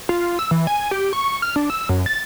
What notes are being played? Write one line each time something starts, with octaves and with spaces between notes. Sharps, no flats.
F4
E6
E3
G#5
G4
C#6
F6
D4
E6
F#2
A6